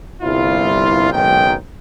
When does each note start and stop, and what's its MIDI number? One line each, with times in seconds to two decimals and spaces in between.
0.22 1.08 31
0.22 1.08 36
0.22 1.08 64
0.22 1.08 65
1.11 1.53 30
1.11 1.53 35
1.11 1.53 44
1.11 1.53 51
1.11 1.53 79